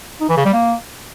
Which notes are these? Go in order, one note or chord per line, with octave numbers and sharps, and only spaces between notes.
D#4
E3
C#3
G3
A#3